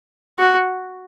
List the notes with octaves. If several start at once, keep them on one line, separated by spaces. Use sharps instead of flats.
F#4